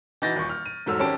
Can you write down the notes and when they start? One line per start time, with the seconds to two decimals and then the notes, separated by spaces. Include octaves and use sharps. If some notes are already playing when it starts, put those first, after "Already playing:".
0.22 E3 D#4 F#4 G6 A6 A#6
0.36 D#1 C#6
0.50 F6
0.66 D#7
0.86 E1 G#2 F#3 A4 E6 F6
1.00 G#1 C#4 G4 A5 D7